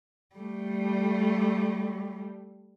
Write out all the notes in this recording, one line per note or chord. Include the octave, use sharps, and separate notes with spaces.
G3 A3